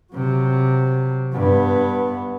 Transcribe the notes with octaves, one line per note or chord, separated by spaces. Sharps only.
C3 F#3
G2 B3